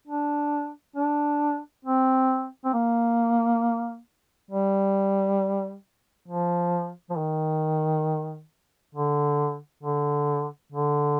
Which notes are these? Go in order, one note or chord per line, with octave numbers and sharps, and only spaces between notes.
D4
D4
C4
C4
A#3
G3
F3
F3
D#3
D3
D3
D3